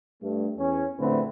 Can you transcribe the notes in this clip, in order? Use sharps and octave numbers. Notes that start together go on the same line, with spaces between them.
G2 A3
E2 C#4
A#1 A2 D3 A3 C4 B4